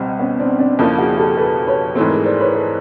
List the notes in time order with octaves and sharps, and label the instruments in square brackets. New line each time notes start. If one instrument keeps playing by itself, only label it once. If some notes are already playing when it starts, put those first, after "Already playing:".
Already playing: [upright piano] C#2 B2 G3 [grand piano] C4
[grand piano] B3 C#4
C4 D4
C4 D4
[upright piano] F2 C#3 F3 A#3 [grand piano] D4 E4
[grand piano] F#4 G#4
G4 A4
A4 B4
B4 C#5
[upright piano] G#2 E3 A3 C4
[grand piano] G#4 A#4
C5 D5
B4 C#5
A4 B4